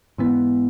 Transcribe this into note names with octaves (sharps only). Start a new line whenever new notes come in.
G#2 E3 B3